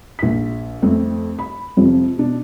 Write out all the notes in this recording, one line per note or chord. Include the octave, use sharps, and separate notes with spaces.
A#1 B6
F2 A3 C4
B5
F2 C3 F3
B2 D4